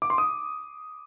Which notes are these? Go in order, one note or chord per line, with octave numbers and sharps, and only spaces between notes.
D6
C6
D#6